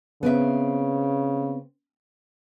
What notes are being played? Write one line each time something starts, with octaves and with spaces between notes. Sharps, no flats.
C#3 B3 C4 E5